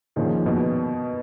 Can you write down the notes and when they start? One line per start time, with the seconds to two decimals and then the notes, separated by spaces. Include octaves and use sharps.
0.16 A#2 D#3 F3 A#3 C#4 G#4
0.46 B2